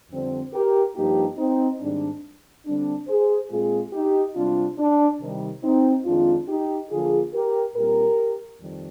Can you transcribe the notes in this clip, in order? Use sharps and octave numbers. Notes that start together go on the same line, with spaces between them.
F2 D3 G3 C4
G4 A#4
G2 F3 A#3 D#4 G4
C4 D#4
G#2 D#3 G3 C4 D4
D3 G3 C4 D4
G#4 C5
A#2 G#3 C4 F4 G#4
D#4 G4
C3 G3 C4 D4 F4
D4
C3 D#3 G3
C4 D#4
F2 D#3 G#3 C4 D4 F4
D#4 G4
D3 F3 A#3 F4 G#4
G4 A#4
A#2 G3 C4 G4 A#4
F2 D#3 G3